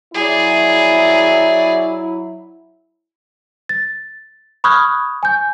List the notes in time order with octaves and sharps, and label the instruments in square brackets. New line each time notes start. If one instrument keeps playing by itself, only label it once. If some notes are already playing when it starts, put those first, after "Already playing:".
[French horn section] F#3 E4 [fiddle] G#4 D5
[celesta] A6
B5 C#6 D#6 F6 F#6 G#6
G#5 G6